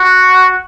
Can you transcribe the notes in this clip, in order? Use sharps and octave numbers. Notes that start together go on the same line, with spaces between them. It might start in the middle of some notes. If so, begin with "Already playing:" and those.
Already playing: F#4